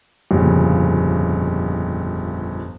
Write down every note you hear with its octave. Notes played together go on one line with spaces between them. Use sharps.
G1 F2 A#2 C#3